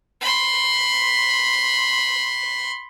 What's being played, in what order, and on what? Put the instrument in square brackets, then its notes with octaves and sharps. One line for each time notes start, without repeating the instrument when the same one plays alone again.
[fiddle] B5 C6